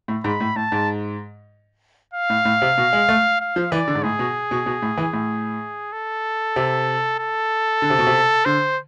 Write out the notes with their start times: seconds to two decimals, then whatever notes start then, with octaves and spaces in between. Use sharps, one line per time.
0.08 A2
0.24 G#2 B5
0.40 A2
0.56 A2 A5
0.72 G#2
2.14 F5
2.30 A2
2.45 A2
2.62 C3
2.78 B2
2.93 G#3
3.09 A3
3.40 F5
3.56 F3
3.72 E3 D5
3.88 D3
3.95 G#2
4.03 A2 G#4
4.19 B2
4.51 B2
4.66 B2
4.82 A2
4.97 E3
5.13 A2
5.93 A4
6.56 C3
7.19 A4
7.82 D3
7.90 C3
7.99 B2
8.07 C3
8.45 D3 C5